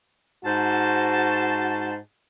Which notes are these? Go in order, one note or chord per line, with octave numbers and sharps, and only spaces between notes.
G#2 F#4 C5 A5